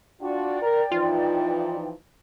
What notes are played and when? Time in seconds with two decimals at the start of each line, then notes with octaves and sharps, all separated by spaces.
0.21 D4 F4 F#4 D5 G5
0.62 A#4
0.92 E3 F3 D#4 F4